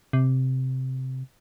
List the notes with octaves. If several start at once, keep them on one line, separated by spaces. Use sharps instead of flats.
C3